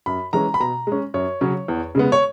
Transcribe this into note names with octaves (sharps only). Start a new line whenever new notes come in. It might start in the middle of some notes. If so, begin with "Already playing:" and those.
F#2 B5
E3 G#3 C#4 A#5
B5
B2 A#5
G#3 C#4
F#2 C#5
C#3 F#3 C#4
E2
C#3 G#3 B3
C#5